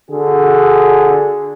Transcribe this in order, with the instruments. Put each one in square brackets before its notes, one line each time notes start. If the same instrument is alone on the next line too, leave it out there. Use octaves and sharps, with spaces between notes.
[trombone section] D3 F#4 G#4